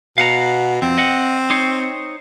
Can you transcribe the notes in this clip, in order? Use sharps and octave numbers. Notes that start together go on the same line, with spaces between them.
B2 F5 F#5 A#5
F2 C4
D#5 F#5
D#4 C5 C#5